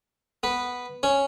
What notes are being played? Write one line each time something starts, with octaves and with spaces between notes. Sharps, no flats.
B3 B4
C#4 C#5